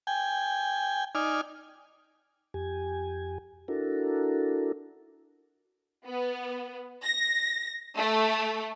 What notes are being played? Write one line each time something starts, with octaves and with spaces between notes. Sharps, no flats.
G5 G#5
D#4 D5 G#5 F6
F2 G4 G#5
D4 E4 F#4 A4 A#4
B3
A#6
A3